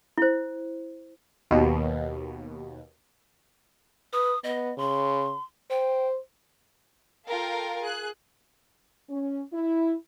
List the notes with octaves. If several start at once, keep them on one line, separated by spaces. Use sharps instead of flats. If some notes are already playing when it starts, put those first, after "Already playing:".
E4 C5
D#2 B2
B4 D#6
B3 D#5
C#3 C6
C5 G5
F4 A4 A#4 F5 G5
G#4 F#6
C#4
E4